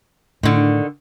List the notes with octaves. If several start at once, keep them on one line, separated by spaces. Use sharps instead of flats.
A2 D3 D#3